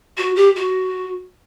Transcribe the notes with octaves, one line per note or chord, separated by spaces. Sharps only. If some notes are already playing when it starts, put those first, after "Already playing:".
F#4
G4
F#4